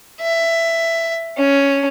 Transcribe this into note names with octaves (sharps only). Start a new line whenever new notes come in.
E5
C#4